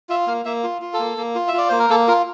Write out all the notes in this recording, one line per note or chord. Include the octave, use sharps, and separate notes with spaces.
F4 E5
A#3 F5
A#3 E5
F4
F4
A4
A#3
A#3
F4
E5
F4 D5
A#3 C5
A#4
A#3 A4
F4 A#4